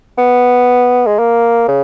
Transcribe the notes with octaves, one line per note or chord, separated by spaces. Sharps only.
B3
G#3
A#3
C#3